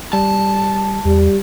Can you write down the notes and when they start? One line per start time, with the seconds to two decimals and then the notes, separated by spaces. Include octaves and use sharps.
0.13 G3 A5
1.05 E2 G3